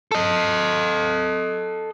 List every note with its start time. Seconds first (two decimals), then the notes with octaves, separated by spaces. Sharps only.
0.12 A4 D#5